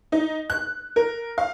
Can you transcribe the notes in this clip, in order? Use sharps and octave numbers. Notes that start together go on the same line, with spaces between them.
D#4
F#6
A#4
F5